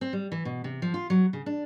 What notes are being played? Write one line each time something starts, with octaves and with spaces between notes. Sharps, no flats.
C4
G3
E3
B2
C3
F3
F4
F#3
C#3
D4